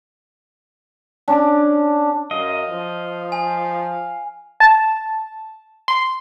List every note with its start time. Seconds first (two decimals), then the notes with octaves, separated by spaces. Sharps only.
1.28 C#4 D4
2.31 F#2 D#5 F5
2.70 F3
3.32 G#5
4.60 A5
5.88 C6